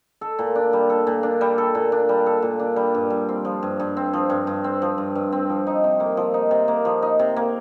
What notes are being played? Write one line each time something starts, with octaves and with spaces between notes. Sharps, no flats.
A4
A#2
D4
G3
A4
A#2
D4
G3
A4
A#2
D4
G3
A4
A#2
D4
G3
G2
G2
C4
F3
G2
G2
C4
F3
G2
G2
C4
F3
G2
G2
C4
F3
D#4
C3
A#3
F3
D#4
C3
A#3
F3
D#4
C3
A#3